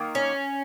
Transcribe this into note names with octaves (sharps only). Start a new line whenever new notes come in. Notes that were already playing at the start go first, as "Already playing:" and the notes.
Already playing: D#3 A#3
C#4